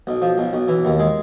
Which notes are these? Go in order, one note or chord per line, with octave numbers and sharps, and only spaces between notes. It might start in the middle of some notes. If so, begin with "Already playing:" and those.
B1
F3
B1
B1
E3
D#2
G#3